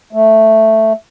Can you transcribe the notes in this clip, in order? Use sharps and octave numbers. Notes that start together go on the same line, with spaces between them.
A3